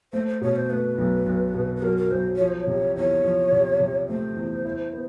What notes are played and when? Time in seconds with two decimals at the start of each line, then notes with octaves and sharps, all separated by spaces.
0.13 A3 C5
0.27 C5
0.41 B2 C#5
0.56 C5
0.70 A3 B4
0.98 B1
1.26 B1
1.54 B2
1.76 B4
1.82 F#3 A#4
1.97 A#4
2.11 B1 C5
2.36 F3 C#5
2.48 C5
2.60 C#5
2.67 C3
2.96 E2 C#5
3.24 F3
3.52 C3
3.80 C3
4.08 A3 C5
4.36 E2
4.65 E4
4.93 B3